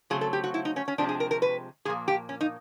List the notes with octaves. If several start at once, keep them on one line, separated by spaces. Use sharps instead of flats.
C#3 F#3 A3 C4 G#4
A4
G4
F#4
E4
D#4
C#4
C#4
C3 F3 G#3 C4 D4
G#4
A#4
A#4
B4
A#2 F3 A#3 G#4
G4
C#4
D#4